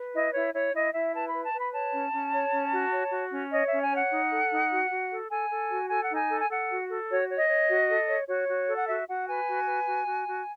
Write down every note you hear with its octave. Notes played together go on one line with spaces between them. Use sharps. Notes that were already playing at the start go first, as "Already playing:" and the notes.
Already playing: B4
E4 D#5
E4 C#5
E4 C#5
E4 D#5
E4 E5
B4 A5
B5
B4
A5
B4
B5
C#5 A5
C#4
C#4
C#5
C#4
F#4
C#5
F#4
C#4
C#5 D#5
E5
C#4
G#5
C#5 F#5
D#4
A4
D#4
F#4
F#4
A4
A4 G#5
A4
F#4
A4 G#5
F#5
D#4
G#5
A4
G#5
A4 F#5
F#4
A4
F#4 C#5
C#5
D#5
C#5
F#4
A4
C#5
F#4 C#5
F#4
A4
F#5
F#4 E5
F#4 F#5
B4 G#5
F#4
B4
F#4
F#4
F#4